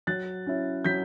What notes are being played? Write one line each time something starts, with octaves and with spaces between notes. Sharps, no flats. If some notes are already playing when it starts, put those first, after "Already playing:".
F#3 F#6 A6
C#4 E4
F#3 G6 B6